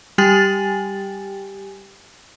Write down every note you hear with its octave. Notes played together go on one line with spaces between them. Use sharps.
G3 G4 G5 G#5 A6 F#7